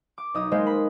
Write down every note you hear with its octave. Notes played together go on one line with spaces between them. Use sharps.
D6
B1 D#4 D#6
G#3 A#3 B4 C5 D#5
B5